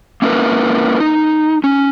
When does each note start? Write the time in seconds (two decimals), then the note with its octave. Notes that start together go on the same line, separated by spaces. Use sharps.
0.22 A#3 C#4 E4 F4 A#4 B4
1.00 D#4
1.64 C#4